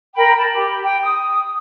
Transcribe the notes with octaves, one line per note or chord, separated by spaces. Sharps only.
A#4 G5 B5
A5 B5
G4
G5
D#6